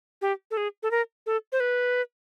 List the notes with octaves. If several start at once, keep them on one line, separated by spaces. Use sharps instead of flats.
G4
A4
G#4
A4
A#4
A4
C5
B4